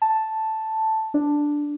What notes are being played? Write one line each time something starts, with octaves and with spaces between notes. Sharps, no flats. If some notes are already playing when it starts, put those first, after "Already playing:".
A5
D4